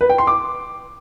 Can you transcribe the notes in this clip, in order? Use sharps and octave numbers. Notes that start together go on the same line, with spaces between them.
B4
G5
C6
D6